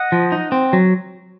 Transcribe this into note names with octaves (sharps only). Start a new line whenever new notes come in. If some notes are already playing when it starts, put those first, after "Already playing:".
Already playing: D#5 F#5
F3
D#4
C4
F#3